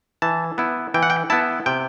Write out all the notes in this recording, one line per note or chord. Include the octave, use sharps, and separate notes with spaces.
E3 A5
B3 E4
E3 G5
F#5
G5
B3 E4 A5
C3 G5